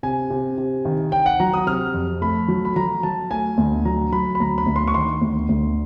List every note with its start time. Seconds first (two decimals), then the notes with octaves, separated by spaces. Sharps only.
0.03 C3 G#5
0.30 C3
0.58 C3
0.85 D#3
1.12 D#3 G5
1.26 F#5
1.40 F#3 A#5
1.53 D#6
1.67 C3 F6
1.94 F2
2.22 A3 B5
2.48 F#3
2.65 B5
2.76 F#3 A#5
3.03 F#3 A5
3.31 A3 G#5
3.58 D2
3.85 F#3 A#5
4.12 F#3 B5
4.35 B5
4.40 D2 A#5
4.58 B5
4.67 D2
4.76 C6
4.88 C#6
4.94 D#3 C6
5.22 D2
5.49 D2